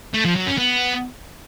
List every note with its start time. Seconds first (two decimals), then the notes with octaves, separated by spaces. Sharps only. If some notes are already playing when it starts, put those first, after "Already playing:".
0.14 A3
0.25 F3
0.36 F#3
0.47 C#4
0.58 B3